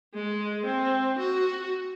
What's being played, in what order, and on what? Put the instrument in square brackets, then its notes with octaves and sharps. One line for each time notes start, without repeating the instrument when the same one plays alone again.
[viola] G#3
C4
F#4